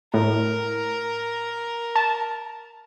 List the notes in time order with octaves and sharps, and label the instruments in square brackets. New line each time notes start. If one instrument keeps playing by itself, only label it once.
[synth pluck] A2 [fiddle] A#4
[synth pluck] A5